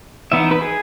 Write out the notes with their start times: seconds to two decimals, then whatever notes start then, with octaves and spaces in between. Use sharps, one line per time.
0.32 E3 B3 D#4 E5
0.51 B4
0.61 G#4